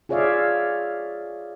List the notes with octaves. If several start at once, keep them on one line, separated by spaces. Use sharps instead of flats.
F4 G#4 C#5 D5 E5 F5